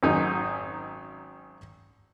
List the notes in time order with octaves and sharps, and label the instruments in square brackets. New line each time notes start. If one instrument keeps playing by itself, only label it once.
[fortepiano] G#1 F#2 D#4 G#4